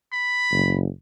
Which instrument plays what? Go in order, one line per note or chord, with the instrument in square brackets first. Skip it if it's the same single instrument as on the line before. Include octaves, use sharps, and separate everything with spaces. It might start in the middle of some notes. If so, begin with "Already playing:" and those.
[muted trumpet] B5
[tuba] F#1